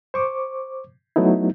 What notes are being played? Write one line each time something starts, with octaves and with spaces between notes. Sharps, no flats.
C5 C#6 D6
F#3 A3 B3 D#4 E4